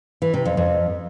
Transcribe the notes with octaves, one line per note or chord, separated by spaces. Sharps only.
E3
C3
F2
F2